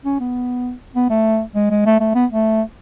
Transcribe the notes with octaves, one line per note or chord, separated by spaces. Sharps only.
C#4
B3
B3
A3
G#3
G#3
A3
A3
B3
A3